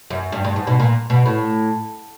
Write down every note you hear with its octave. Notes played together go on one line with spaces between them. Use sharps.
F#2
G2
G2
G#2
B2
A#2
B2
A2